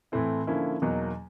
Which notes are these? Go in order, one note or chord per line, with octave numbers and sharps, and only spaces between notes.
A2 E3 A3 C4 E4
D3 F3 A#3 C#4 E4
E2 B2 F#3 A#3 D#4